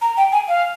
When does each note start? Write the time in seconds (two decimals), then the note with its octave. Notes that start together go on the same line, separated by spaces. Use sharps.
0.02 A#5
0.17 G5
0.32 G#5
0.48 F5